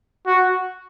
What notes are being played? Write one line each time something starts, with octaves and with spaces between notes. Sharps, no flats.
F#4